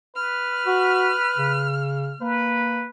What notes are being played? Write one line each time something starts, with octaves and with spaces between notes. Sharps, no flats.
B4 F6
F#4
C#3
A#3 B4